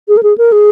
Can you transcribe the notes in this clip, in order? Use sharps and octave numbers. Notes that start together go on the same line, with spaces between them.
G#4
A#4
G#4
A#4
G#4